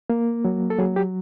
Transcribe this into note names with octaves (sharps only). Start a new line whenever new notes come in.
A#3
F#3
A4
F#3 G#4
G4